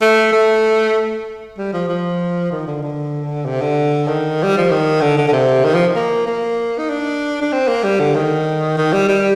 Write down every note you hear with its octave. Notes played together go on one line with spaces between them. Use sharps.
A3
A3
G3
F3
F3
D#3
D3
D3
C3
D3
D#3
G3
F3
D#3
D3
D3
D3
C3
D#3
F3
A#3
A#3
D#4
D4
D4
C4
A#3
G3
D3
D#3
D#3
G3
G3